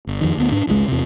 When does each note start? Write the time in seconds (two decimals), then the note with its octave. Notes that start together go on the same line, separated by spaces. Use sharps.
0.07 G1
0.21 F2 D#3
0.37 D2 B3
0.52 G#2 D4
0.67 G#1 C#2 D3 G#3
0.88 E2 C3